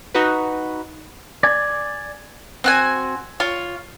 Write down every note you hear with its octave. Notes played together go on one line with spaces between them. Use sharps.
D#4 F#4 B4
D5 G#5
C4 F#4 G#5
F4 C#5